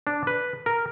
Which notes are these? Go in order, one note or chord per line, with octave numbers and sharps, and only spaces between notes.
D4
B4
A#4